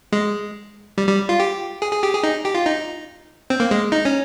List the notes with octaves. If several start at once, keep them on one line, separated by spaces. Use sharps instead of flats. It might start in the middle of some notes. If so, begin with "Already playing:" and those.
G#3
G3
G3
F4
G4
G#4
G#4
G4
G#4
D#4
G4
F4
D#4
C4
A#3
G#3
D#4
C#4